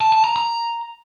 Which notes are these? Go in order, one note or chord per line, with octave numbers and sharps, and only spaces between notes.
A5
A5
A#5
A#5